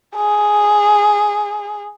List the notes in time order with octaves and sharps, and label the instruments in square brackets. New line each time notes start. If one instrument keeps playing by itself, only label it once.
[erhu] G#4